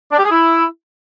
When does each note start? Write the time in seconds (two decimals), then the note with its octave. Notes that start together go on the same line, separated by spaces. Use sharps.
0.12 D4
0.18 G4
0.25 G#4
0.31 E4